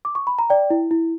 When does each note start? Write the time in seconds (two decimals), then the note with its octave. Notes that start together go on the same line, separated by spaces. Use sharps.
0.05 D6
0.15 C#6
0.27 B5
0.39 A#5
0.50 D5 G5
0.70 E4
0.91 E4